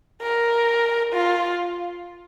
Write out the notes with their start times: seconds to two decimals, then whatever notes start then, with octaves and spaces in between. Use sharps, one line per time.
0.22 A#4
1.12 F4